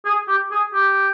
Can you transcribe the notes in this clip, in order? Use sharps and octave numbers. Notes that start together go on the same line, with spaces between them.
G#4
G4
G#4
G4